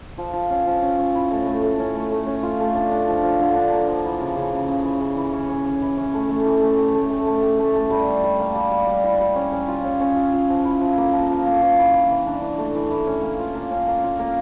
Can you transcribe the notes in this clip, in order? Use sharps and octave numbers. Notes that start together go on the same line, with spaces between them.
F3
F3
C#4
F3
C#4
C#4
E4
A2
A3
A3
C#4
A3
A3
C#4
F4
A3
D4
D4
F3
F3
D3
D4
A#3
F3
E3
C#3
C#3
C#3
C#3
E3
C#3
E3
C#4
C#4
C#4
E3
C#4
A3
A3
E3
A3
G4
A3
A3
A3
G4
A3
A3
G3
G3
G3
A#3
G3
G3
G3
E4
G3
C#4
C#4
F4
C#4
C#4
F4
F4
F3
E4
F3
A#3
F3
F3
A#3
F3
E3
E3
E3
D4
E3
A3
E3
E3
C#4
A#3
F4
A#3
C#4
A#3
F4
A#3